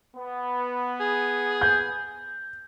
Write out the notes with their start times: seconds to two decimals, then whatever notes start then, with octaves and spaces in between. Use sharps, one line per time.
0.16 B3
1.00 G#4
1.61 G6